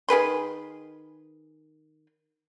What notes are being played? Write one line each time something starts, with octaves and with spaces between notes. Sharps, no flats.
D#3 G#4 B4 C6